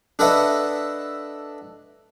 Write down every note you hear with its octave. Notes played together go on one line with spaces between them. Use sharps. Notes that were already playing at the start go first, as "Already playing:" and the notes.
D4 A4 B4 D#5 E5 F#5